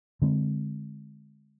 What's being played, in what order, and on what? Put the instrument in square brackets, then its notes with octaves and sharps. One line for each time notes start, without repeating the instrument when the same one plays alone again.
[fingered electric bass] D3 G#3 C4